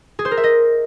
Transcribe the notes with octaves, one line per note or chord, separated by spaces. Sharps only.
G#4
C5
A#4
E5
D#5